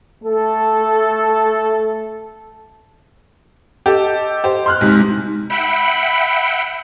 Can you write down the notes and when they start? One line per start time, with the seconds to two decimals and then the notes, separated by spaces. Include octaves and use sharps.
0.24 A3 A4
3.86 G4 A4 D#5
4.44 G4 C5
4.66 C6 F6 F#6
4.81 B1 C3 G#3 D#4
5.50 E5 F#5 G5 B5